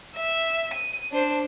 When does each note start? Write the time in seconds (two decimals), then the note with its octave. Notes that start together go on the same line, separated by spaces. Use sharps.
0.15 E5
0.74 D#7
1.12 D4 C5